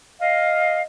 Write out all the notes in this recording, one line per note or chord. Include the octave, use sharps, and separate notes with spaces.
D#5 F5